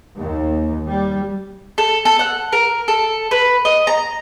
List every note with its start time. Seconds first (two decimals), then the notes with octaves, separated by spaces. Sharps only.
0.19 D#2
0.86 G3
1.78 A4
2.05 A4
2.19 F#5
2.52 A#4
2.88 A4
3.31 B4
3.65 D#5
3.87 A#5